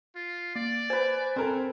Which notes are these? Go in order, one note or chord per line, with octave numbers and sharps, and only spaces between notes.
F4
A#3 D5
B4 C5 G#5
C4 A4 A#4 C5